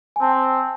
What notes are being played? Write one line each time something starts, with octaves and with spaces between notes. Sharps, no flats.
G#5
C4 A5